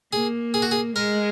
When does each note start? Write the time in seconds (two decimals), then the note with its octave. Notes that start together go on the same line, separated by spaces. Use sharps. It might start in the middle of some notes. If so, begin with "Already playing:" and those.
0.13 A#3 G#4
0.54 G#4
0.62 F#4
0.71 G#4
0.96 G#3 A#4